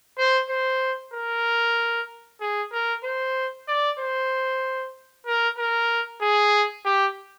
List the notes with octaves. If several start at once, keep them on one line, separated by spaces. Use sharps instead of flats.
C5
C5
A#4
G#4
A#4
C5
D5
C5
A#4
A#4
G#4
G4